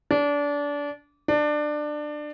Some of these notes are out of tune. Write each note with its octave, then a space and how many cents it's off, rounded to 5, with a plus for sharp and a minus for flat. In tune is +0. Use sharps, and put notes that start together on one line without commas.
D4 -25
D4 +20